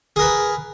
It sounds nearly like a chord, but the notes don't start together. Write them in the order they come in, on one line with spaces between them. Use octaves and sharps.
G#4 A#4 B4